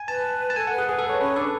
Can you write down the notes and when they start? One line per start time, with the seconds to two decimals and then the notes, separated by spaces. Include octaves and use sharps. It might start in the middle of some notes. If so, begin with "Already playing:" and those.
Already playing: G#5
0.08 B4 A5
0.50 A5
0.56 A4 G#5
0.67 F#5
0.72 B4
0.78 G#4
0.89 G#4 B4
0.99 A4
1.05 B4 C#5
1.21 C#4 B4
1.36 D4 A4